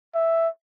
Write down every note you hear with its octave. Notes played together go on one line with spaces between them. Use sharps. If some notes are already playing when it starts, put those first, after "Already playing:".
E5